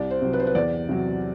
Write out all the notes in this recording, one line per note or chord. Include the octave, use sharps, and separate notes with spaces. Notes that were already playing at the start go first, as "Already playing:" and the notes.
Already playing: C2 D5
C5
C3 F#3
B4
C5
B4
E2 D5
C3 F#3